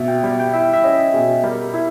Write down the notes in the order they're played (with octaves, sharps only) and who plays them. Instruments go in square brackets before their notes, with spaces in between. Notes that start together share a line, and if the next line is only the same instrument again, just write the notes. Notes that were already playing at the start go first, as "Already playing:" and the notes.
Already playing: [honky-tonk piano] B2 [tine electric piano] E5
[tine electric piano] G5
[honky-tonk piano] G3
[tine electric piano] G5
[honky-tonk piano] E4 [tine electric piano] E5
[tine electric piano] E5
[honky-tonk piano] C#4 [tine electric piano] D#5
[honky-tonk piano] B2 [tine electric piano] G#4
[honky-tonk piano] G3 [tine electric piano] A#4
[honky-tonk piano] E4